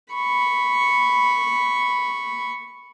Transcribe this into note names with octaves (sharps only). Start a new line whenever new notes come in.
B5 C#6